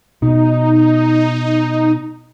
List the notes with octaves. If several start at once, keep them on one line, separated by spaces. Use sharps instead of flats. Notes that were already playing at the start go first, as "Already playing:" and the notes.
B2 D#4